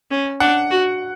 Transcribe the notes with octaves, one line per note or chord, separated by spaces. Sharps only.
C#4
D4 F#5
F#4